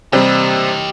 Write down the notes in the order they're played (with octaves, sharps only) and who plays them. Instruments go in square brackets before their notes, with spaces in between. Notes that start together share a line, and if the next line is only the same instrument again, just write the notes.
[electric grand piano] C3 [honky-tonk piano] G3 C4 [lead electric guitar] G4 D#5